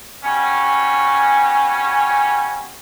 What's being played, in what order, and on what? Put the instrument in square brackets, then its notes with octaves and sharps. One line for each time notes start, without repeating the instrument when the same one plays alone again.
[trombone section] B2 G3 C#4